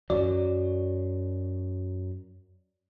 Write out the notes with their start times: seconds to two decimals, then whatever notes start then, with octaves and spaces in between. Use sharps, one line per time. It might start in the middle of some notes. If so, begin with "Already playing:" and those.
0.10 F#2 F#3 D5